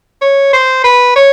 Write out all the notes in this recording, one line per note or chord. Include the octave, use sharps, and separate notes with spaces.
C#5
C5
B4
C#5